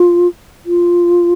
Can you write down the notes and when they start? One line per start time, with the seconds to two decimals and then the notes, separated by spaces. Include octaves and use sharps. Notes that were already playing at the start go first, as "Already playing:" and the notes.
Already playing: F4
0.66 F4